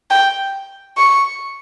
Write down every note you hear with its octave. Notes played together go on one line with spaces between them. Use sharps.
G5
C#6